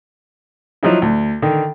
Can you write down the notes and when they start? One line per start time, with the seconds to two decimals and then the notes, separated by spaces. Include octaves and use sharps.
0.83 F3 F#3 D#4 E4
1.02 D2
1.42 D3 D#3